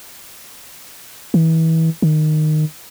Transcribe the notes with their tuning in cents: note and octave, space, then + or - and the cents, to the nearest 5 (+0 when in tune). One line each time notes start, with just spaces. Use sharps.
E3 -30
D#3 -15